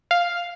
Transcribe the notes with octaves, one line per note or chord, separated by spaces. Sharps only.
F5